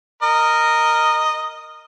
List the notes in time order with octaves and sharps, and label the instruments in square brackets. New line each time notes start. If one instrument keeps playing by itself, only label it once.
[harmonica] A#4 D#5